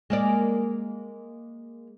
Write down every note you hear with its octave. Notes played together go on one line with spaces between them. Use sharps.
G#3 A#3 D5